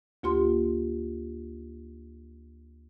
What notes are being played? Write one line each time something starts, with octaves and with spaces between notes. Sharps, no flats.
D2 A#3 F4 G4 C6